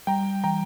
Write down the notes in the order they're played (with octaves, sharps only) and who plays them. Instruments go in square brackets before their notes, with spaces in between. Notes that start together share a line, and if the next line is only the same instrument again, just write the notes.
[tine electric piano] G3 [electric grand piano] G5 A#5
[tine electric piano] E3 [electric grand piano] G5 A#5